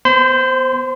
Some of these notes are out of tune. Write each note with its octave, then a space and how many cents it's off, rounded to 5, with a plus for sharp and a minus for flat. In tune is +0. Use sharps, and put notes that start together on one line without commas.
B3 +0 C5 +0 C6 -40